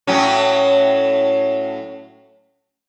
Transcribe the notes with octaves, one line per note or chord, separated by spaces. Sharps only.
A2 F#3 C#4